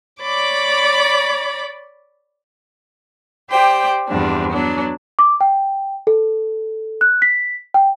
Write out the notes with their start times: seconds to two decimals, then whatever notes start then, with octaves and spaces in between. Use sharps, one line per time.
0.22 C#5 D5 B5 D6
3.50 G4 C5 D5 G5
4.07 E2 G2 C3 F3 D4
4.51 F#3 B3 D4
5.19 D6
5.41 G5
6.07 A4
7.01 F#6
7.22 B6
7.74 G5